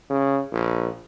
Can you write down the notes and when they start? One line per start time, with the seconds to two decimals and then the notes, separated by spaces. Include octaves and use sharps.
0.10 C#3
0.52 A#1